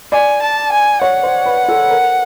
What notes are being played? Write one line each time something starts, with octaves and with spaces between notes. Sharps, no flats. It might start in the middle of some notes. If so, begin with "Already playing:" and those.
D5 G#5
A5
G#5
C#5 F#5
C5
B4
A4
A#4